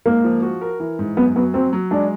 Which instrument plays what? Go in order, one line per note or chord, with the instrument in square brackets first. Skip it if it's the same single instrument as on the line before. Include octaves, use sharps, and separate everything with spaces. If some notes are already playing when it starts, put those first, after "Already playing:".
[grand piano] G#2 [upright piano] A#3
[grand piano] F3
F#4
A#4
E3
G#2
[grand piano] F#2 [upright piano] B3
[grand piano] F#3 [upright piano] B3
[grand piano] F#3 [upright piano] C4
[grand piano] F#3
[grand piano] G#3 [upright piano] D4